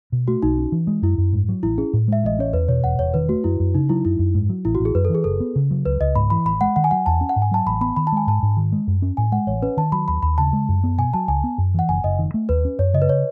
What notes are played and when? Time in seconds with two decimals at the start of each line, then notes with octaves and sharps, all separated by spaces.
0.12 B2
0.28 A3 F#4
0.43 B1 D#4
0.58 C#4
0.72 E3
0.87 G#3
1.02 F#2 E4
1.18 F#2
1.33 G#2
1.49 F#3
1.63 A1 E4
1.78 C#4 G#4
1.93 A2
2.08 G#3 E5
2.24 A1 D#5
2.39 C#4 C#5
2.53 E2 B4
2.69 B2 C#5
2.84 E1 F#5
2.99 E1 C#5
3.14 D#3 B4
3.29 A3 F#4
3.44 F#2 E4
3.60 F#2
3.74 C#3 D#4
3.89 F#3 E4
4.05 F#2 E4
4.19 F#2
4.35 G#2
4.49 F#3
4.65 A1 E4
4.75 F#4
4.80 A1
4.85 G#4
4.95 F#2 B4
5.05 A4
5.10 E3 G#4
5.24 F#1 A4
5.40 B3
5.56 C#3
5.71 F#3
5.86 C#2 B4
6.00 C#2 D#5
6.15 G#2 B5
6.30 E3 B5
6.45 A1 B5
6.61 G#3 F#5
6.76 D#3 F#5
6.84 G#5
6.91 F#3 F#5
7.06 E2 A5
7.21 C#4
7.29 F#5
7.36 G#2
7.42 G#5
7.51 F#3 A5
7.66 A1 B5
7.81 B3 B5
7.96 D#3 B5
8.07 A5
8.12 G#3 G#5
8.27 G#2 A5
8.43 G#2
8.57 D#3
8.72 G#3
8.87 F#2
9.02 C#4
9.17 A2 G#5
9.32 G#3 F#5
9.47 A1 C#5
9.63 C#4 B4
9.77 D#3 A5
9.92 F#3 B5
10.08 D#2 B5
10.23 D#2 B5
10.38 C#3 A5
10.53 G#3
10.69 F#2
10.84 B3
10.98 B2 G#5
11.14 F#3 A5
11.28 C#2 G#5
11.44 B3
11.58 F#2
11.74 E3 F#5
11.89 F#1 G#5
12.04 F#1 D#5
12.19 D#3
12.34 A3
12.49 D#2 B4
12.65 C#4
12.79 F#2 C#5
12.94 C#3 D#5
13.02 B4
13.09 C#5